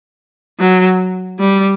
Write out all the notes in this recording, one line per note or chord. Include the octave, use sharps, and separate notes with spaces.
F#3
G3